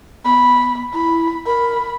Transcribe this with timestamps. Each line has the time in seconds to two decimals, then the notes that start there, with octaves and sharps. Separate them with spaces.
0.24 B3 B5
0.94 E4 B5
1.46 A#4 B5